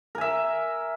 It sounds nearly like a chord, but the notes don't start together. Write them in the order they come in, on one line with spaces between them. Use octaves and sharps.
A#4 G#5 E5